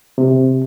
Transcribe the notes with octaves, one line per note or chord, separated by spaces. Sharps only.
C3